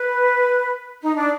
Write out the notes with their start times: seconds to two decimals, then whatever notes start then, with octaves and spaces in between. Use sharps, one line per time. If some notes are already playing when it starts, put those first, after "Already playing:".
Already playing: B4
1.02 D#4
1.16 D4